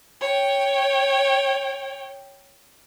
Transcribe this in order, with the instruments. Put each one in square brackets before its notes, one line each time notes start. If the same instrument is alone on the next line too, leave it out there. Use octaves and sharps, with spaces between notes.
[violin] C#5 G5